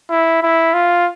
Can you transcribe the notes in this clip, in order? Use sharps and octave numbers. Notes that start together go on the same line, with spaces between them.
E4
E4
F4